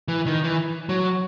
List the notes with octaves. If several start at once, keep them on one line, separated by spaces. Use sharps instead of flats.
E3
D#3
E3
F#3